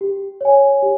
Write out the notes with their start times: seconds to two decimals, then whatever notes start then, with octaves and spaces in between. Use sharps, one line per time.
0.01 G4
0.41 C#5 G#5
0.83 G4